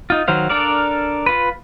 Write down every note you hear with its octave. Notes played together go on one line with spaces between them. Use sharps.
D#4 F4
D#3 F#3 C5 F5
D4 A4 A#4 D5 F5
F4 B4